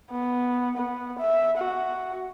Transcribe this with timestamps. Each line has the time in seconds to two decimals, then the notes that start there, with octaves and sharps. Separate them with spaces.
0.11 B3
0.77 B3
1.19 E5
1.58 F#4